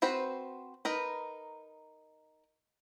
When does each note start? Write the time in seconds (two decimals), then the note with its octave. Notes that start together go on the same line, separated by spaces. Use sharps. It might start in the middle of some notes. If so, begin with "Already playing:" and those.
0.02 C4 F#4 B4 C5
0.85 D#4 A#4 B4